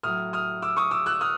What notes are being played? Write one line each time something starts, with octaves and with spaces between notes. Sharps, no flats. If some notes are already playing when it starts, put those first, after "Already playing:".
A2 F#3 D#6 F6
D#6 F6
D6 E6
C#6 D#6
D6 E6
E6 F#6
D#6 F6